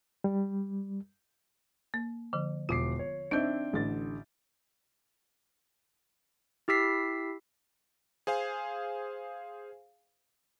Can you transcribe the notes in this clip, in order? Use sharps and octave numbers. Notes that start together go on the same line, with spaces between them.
G3
A#3
D3 F3
E1 F4 D6 C7
C#5
C4 D4 D#4 D#5 E5 G6 D7
A1 D3 A6
E4 G4 E6 B6 C7
G#4 C5 F5 G#5